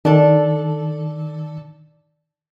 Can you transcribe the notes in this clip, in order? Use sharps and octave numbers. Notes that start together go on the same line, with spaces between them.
D#3 D4 A4